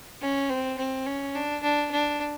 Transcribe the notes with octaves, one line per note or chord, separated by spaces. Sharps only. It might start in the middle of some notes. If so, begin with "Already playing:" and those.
C#4
C4
C4
C#4
D4
D4
D4